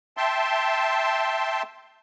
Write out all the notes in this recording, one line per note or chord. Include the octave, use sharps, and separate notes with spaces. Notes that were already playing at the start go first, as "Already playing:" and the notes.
E5 G5 A5 C6